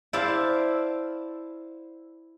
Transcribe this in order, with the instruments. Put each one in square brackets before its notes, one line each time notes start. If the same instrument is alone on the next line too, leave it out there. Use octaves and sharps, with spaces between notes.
[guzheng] E4 C5 D5 E5 F5 A5